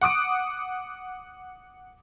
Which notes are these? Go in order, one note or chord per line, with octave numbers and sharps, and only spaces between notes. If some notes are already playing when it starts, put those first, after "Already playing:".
F#5 D6 D#6 D7